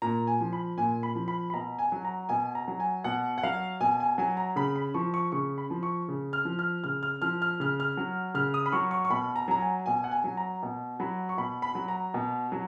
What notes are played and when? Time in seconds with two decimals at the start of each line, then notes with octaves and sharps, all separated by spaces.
0.02 A#2 A#5
0.27 G#5
0.41 F3
0.53 B5
0.78 A#2 G#5
1.03 B5
1.15 F3
1.28 B5
1.50 B5
1.54 B2 A#5
1.79 G#5
1.92 F#3
2.05 A#5
2.29 B2 G#5
2.55 A#5
2.68 F#3
2.80 G#5
3.04 B2 F#5
3.38 F#5
3.43 F#3 F5
3.80 B2 G#5
4.00 G#5
4.18 F#3 G#5
4.37 A#5
4.56 C#3 B5
4.76 B5
4.94 F3 C#6
5.14 C#6
5.32 C#3 C#6
5.58 B5
5.70 F3
5.83 C#6
6.08 C#3
6.33 F6
6.45 F3
6.59 F6
6.84 C#3 F6
7.03 F6
7.22 F3 F6
7.42 F6
7.60 C#3 F6
7.80 F6
7.97 F#3
8.34 C#3 F6
8.54 D#6
8.66 B5
8.72 F#3 C#6
8.91 C#6
9.05 C#6
9.10 B2 B5
9.36 A#5
9.48 F#3 A#5
9.61 G#5
9.86 B2 G#5
10.04 F#5
10.11 G#5
10.24 F#3
10.37 A#5
10.63 B2
11.00 F#3 B5
11.29 C#6
11.38 B2 B5
11.62 B5
11.75 F#3
11.88 A#5
12.14 B2
12.52 F#3